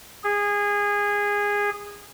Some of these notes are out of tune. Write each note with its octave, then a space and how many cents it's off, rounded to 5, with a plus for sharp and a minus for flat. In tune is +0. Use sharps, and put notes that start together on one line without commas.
G#4 -20